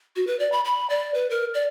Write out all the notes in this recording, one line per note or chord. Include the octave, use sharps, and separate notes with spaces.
F#4
B4
D5
B5
B5
D5
B4
A#4
D5